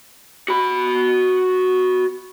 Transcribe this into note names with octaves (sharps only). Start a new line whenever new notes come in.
F#4 B5